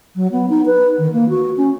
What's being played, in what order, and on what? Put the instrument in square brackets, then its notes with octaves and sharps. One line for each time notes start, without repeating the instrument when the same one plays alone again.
[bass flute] F#3
B3
D#4
B4
D#3
A#3
F#4
C#4